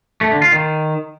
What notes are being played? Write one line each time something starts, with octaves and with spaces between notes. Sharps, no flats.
A3
D3
F4
D#3